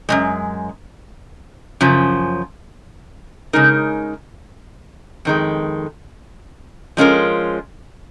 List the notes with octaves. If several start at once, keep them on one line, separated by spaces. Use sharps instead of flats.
F#2 C#3 G#3
F#2 C#3 F3
C#3 G#3 D#4 A#4
F2 D#3 G#3
F3 G#3 C#4 F4 A#4